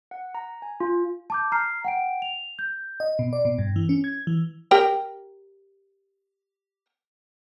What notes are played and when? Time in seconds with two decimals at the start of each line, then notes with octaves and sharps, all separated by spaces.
0.11 F#5
0.35 A#5
0.62 G#5
0.80 F4
1.30 A5 D6 G6
1.52 A#5 F6 C7
1.84 F#5 G5 D7
2.22 F7
2.59 G6
3.00 D#5
3.19 B2
3.33 D5
3.45 B2
3.58 G2
3.76 E3
3.89 C#4
4.04 G#6
4.27 E3
4.71 G4 A#4 G5